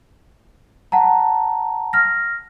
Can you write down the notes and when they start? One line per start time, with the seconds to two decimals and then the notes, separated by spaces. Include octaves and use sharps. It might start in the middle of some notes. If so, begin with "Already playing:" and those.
0.92 F#5 A5 A#5
1.93 F6 A#6